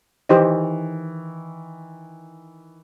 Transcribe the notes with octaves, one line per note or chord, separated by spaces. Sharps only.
D#3 E3 G4 C5 D#5